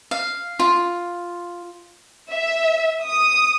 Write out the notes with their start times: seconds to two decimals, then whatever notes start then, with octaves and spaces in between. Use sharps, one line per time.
0.11 F5
0.59 F4
2.32 E5
3.06 D#6